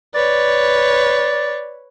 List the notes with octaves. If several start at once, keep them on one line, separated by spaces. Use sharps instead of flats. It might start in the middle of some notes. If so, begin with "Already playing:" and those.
B4 C#5 D5